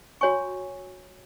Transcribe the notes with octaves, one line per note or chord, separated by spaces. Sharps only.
F#4 C#5 G#5 C#6